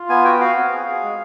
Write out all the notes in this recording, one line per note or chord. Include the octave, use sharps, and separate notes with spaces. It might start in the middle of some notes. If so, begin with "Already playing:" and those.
Already playing: F4
B3 G#5
F#4 G5
F#4 F5
C4
G#4
G#4
G#3